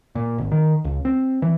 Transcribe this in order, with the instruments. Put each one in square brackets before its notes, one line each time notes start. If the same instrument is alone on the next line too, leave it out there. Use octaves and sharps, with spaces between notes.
[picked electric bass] A#2
G#1
D#3
C#2
C4
E3